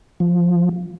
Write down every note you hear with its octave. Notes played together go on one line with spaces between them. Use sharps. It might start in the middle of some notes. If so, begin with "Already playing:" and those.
F3